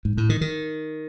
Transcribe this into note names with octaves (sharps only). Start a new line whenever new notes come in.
G#2
A2
D#3
D#3